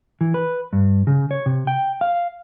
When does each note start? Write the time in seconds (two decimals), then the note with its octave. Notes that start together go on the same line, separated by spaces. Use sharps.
0.21 E3
0.34 B4
0.73 G2
1.07 C#3
1.31 C#5
1.46 C3
1.67 G5
2.01 F5